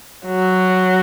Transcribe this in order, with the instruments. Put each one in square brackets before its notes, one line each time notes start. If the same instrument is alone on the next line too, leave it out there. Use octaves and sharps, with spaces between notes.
[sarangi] F#3